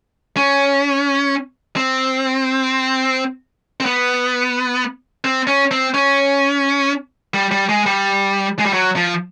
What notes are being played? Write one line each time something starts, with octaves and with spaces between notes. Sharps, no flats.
C#4
C4
C4
B3
C4
C#4
C4
C#4
G3
G3
G#3
G3
G#3
G3
F#3
F3